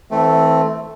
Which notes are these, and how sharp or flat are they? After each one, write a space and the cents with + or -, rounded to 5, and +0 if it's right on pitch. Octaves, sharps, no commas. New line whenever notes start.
E3 -35 A3 +0 C4 +0